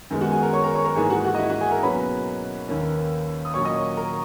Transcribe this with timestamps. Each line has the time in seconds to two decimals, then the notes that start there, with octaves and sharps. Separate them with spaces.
0.10 F#2 D#3 G#3 B3
0.21 F#4 F#5
0.31 G#4 G#5
0.42 A#4 A#5
0.53 C#5 C#6
0.64 A#4 A#5
0.75 C#5 C#6
0.85 A#4 A#5
0.96 G#2 E3 A#3 G#4 G#5
1.10 F#4 F#5
1.25 F#4 F#5
1.35 D#5
1.39 E4 E5
1.50 F#4 F#5
1.61 G#4 G#5
1.71 A#4 A#5
1.83 B2 F#3 A#3 C#4 B4 B5
2.68 D#2 D#3 A#3 C#4
3.45 D#6
3.54 A#2 F#3 C#4 C#5 C#6
3.65 D#5 D#6
3.76 C#5 C#6
3.97 A#4 A#5